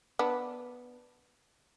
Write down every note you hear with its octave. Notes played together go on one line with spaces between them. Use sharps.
B3 D4